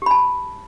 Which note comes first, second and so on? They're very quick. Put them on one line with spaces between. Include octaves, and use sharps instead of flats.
G4 B5 A5